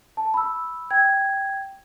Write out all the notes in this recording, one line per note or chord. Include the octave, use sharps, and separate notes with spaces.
A5
B5 E6
G5 G#6